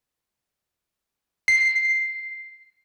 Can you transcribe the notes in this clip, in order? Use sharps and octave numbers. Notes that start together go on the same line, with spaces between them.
C7